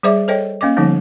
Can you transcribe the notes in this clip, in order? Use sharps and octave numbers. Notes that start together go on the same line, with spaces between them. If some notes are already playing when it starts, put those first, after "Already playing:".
G3 G#4 C5 D5 E5 D6
A4 C5 C#5 D#5 G5
A#3 C#4 D#5 D6
D3 F3 G3 B3 D#4